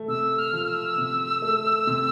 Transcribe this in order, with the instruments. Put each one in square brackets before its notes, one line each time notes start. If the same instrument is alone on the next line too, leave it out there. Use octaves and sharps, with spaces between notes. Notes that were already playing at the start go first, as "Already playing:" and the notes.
Already playing: [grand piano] A3
[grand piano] C3 [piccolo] E6
[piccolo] F6
[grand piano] F3
[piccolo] E6
[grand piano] C3
A3
C3